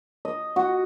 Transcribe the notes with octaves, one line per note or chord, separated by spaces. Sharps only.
D#5
F#4